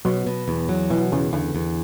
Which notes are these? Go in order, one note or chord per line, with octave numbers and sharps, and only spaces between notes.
B2 F#3
B2
E2
F#3
B2 E3
E2 C#3
E2 D3
E2